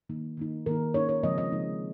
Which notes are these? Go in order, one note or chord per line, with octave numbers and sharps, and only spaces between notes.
D#3 A#3 D#4
D#3 A#3 D#4
D#3 A#3 D#4 A#4
D#3 A#3 D#4 C#5
C#5
C#3 F3 G#3 C4 D#4 D#5
D#5
C#3 F3 G#3 C4 D#4